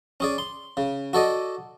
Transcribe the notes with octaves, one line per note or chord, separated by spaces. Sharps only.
C#4 G#4 D5
C6
C#3
F#4 A4 D5 D#5